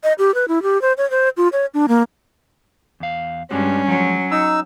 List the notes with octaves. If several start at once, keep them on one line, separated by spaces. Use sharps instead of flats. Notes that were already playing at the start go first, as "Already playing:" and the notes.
D#5
G4
B4
E4
G4
C5
C#5
C5
F4
C#5
D4
A#3
E2 F5
G2 G3 G#3 C#4 F#4
F3 F#3 G#3
D#4 A#5 E6